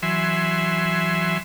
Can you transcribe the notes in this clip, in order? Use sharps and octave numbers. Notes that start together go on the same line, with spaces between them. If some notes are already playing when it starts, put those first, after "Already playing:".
E3 F#3 E5 G#5 C6